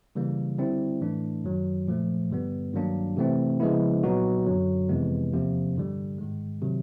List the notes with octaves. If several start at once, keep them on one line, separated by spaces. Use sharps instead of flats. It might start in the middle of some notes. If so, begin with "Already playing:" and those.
C#3 E3 G3 A#3
D3 G3 C4 E4
A2 E3 A3 D4
F#2 D#3 F#3
A#2 F3 A3
G2 D3 G3 B3
G2 D#3 F#3 A#3 D4
C3 E3 A3 C4
C#3 F3 G#3 B3 E4
A#2 F#3 B3 D#4 F#4
F#2 D3 F#3
F2 C3 E3 G#3 B3
E2 C3 F3 A#3
G2 D3 G3
G#2 D#3 G#3
C3 D#3 F#3